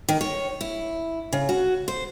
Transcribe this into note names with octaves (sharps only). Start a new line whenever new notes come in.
D#3
C#5
E4
C#3
F#4
C5